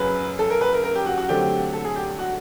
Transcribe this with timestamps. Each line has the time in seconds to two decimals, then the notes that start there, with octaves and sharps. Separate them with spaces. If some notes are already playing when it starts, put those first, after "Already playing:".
Already playing: F#2 C#3 F#3 B4
0.39 A4
0.50 A#4
0.61 B4
0.73 A#4
0.84 A#4
0.95 G4
1.06 F#4
1.18 F#4
1.29 D3 F#3 A3 C4 G4
1.73 A4
1.85 G#4
1.96 G4
2.19 F#4